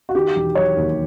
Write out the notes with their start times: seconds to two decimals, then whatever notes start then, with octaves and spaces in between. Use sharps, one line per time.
0.09 F#4
0.15 D#3 G4
0.36 E1
0.55 F#3 C#5
0.77 D#2